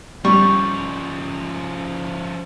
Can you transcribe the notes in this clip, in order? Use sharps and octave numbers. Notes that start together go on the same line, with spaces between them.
F3 G3 C#4 C#6